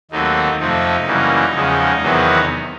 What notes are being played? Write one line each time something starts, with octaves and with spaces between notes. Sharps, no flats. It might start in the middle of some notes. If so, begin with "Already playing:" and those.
D#2 D#3 F#3 A3 C4 D#4
F2 C3 F3 A3 C4 D#4
F#2 C#3 E3 G3 A#3
E2 C#3 F3 G#3
E2 C3 D#3 F#3 B3